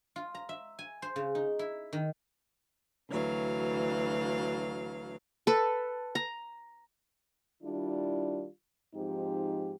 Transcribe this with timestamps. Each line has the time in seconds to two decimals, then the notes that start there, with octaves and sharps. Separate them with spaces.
0.16 F4
0.35 A#5
0.49 E5
0.79 G#5
1.02 C5
1.16 C#3
1.35 D#4
1.59 E4
1.93 D#3
3.09 D2 E3 F#3 F5
5.47 A4 B4
6.15 A#5
7.63 D#3 G3 D4 E4 F4
8.94 G#2 F3 C4 D#4 G4